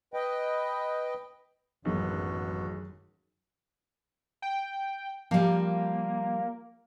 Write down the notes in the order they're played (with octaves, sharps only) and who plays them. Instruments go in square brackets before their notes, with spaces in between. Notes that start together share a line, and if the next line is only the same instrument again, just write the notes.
[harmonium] B4 D#5 G5
[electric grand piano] A1 [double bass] F#2 [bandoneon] D3 B3 F#4 [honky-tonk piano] D#3 F#3 G#3
[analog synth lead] G5
[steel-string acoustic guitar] F3 G3 [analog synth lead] A#3